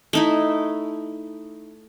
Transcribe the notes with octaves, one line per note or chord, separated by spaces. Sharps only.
A3 D#4 E4